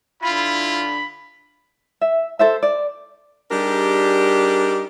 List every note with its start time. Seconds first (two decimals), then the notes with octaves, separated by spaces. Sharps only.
0.23 D3 E4 F4 B5
2.01 E5
2.39 A4 C5 E5
2.63 D5
3.50 G3 D4 D#4 G4 G#4 A#4